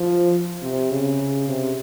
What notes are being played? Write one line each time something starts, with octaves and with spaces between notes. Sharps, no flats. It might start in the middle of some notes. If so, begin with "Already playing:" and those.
Already playing: F3
C3
C#3
C3